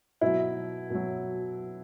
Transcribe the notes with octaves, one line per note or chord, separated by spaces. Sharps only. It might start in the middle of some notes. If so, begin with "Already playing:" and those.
B2 F#3 E4
B2 F#3